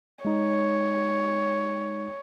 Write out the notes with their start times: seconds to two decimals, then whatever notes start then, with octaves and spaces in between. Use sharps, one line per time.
0.25 G#3 D#4 C#5